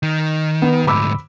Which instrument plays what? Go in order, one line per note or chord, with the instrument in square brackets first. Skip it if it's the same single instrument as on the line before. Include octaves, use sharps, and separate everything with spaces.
[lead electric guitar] D#3
[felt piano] B3
[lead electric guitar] D2 G#2 [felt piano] B5 D6 E6